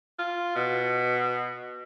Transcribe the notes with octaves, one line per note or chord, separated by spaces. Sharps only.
F4
B2